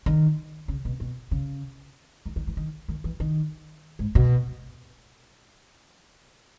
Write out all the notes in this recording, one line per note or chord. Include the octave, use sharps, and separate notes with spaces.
D#3
C#3
B2
B2
C#3
D#3
D#3
E3
D#3
D#3
E3
D#3
G#2
B2